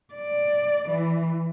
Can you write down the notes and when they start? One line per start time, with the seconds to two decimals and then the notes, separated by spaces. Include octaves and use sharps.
0.14 D5
0.90 E3